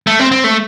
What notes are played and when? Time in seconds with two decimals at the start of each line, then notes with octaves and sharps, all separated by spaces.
0.07 A3
0.19 C4
0.32 C4
0.44 A3